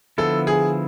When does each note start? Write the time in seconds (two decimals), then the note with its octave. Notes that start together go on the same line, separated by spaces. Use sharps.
0.18 D3 F3 B3 E4 A4
0.47 G#4